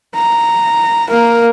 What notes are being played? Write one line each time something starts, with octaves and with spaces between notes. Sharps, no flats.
A#5
A#3 A#4